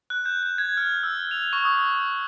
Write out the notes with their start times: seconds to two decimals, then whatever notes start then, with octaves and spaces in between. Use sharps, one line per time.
0.10 F#6
0.25 G6
0.43 G6
0.58 G#6
0.77 F6
1.03 E6
1.31 F7
1.53 C#6
1.65 D#6
1.94 G6